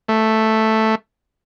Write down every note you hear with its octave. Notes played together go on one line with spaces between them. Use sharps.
A3